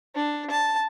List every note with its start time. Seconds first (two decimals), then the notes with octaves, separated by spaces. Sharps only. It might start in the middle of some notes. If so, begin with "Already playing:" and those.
0.15 D4
0.50 A5